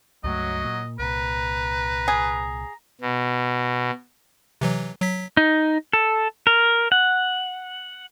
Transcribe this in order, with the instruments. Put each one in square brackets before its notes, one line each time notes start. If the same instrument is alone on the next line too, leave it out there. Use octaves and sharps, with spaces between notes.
[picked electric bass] C#2 G2 A3 [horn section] F#3 [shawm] D#5
[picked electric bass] A#2
[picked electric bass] C2 A#2 [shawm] B4 [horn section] A#5
[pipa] G#4
[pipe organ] B2
[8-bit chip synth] C3 E3 F#3
F#3 B6
[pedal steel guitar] D#4
A4
A#4
F#5